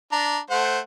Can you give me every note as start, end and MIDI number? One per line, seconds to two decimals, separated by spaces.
0.12 0.39 62
0.12 0.39 82
0.50 0.79 57
0.50 0.79 72
0.50 0.79 78